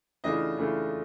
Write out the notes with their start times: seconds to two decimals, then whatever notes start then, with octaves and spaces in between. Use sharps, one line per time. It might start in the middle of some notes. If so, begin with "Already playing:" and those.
0.24 C#3 E3 A3 D4 F4 D#5
0.57 C#3 E3 A3 D4 F4